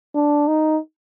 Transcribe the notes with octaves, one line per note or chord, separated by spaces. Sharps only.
D4
D#4